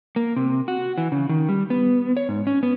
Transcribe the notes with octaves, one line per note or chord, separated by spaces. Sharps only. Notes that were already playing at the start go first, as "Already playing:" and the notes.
A#3
C3
F#4
E3
C#3
D#3
G3
B3
C#5
G#2
C#4
B3